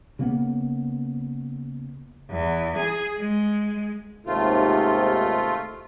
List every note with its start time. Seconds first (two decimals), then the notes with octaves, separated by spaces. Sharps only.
0.19 C#3 A#3 B3
2.29 E2
2.76 G#4
3.17 G#3
4.26 D#2 G#2 C3 A3 F4